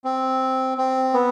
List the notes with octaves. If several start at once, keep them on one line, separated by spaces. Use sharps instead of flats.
C4
C4
B3